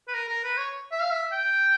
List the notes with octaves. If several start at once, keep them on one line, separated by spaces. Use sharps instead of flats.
B4
A#4
A#4
B4
C#5
E5
F5
E5
G5